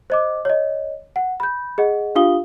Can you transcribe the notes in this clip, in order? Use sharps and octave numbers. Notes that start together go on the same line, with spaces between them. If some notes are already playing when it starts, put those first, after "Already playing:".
C5 D#5 D6
C#5 D#5
F#5
B5 G6
G#4 D#5 F#5
D4 F4 G4 F5 D#6 G7